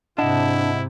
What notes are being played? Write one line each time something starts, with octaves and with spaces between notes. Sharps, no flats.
G#2 C3 D4 E4 D#5 F#5 A5